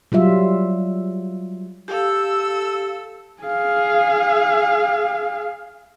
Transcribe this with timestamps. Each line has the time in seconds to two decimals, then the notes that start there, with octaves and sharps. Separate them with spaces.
0.12 F#3 G3 F4 E5
1.88 G4 A4 F5 E6
3.42 G#4 F5